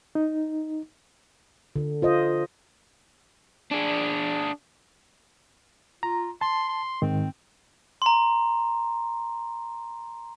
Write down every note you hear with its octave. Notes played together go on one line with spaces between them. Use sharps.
D#4
D3
F4 C5 D#5
D4 G#4
F4 A#5
A5 C6
C6
G#2 D#3 C4
A#5 C6